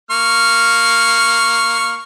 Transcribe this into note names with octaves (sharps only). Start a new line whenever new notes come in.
A#3 C#6 F6